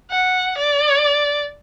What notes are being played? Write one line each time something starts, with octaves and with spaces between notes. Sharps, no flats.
F#5
D5